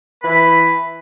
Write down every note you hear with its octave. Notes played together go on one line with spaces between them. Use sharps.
E3 B4 B5